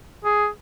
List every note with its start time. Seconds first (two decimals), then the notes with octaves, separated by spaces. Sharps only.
0.25 G#4